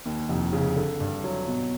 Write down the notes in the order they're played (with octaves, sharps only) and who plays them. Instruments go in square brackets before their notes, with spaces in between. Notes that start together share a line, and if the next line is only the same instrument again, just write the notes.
[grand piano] D#2
F1
C#3
D3
G2
F#3
B2